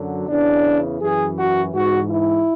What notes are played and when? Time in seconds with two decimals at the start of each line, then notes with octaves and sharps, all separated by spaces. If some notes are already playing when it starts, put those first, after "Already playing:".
Already playing: F#2 D3 F#3
0.28 E2 C#3 E3 D4
1.01 F#2 E3 G#4
1.37 F#4
1.74 G#2 E3 F#4
2.11 E4